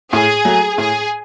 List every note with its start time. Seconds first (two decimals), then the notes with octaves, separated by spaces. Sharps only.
0.13 A2 G#4
0.45 F#3 A3
0.77 A2 G#4